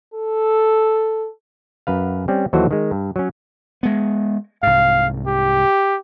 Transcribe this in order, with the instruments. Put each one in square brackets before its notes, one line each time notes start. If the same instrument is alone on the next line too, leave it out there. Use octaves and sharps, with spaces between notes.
[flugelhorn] A4
[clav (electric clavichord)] F#2 B4 F5
G3 C4 C#4
D#2 E3 F#3 F#4 A4 C5
D#3 G#3
G2
F#3 C#4
[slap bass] G#3 B3
[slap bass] C2 G#2 [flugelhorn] F5
[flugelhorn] G4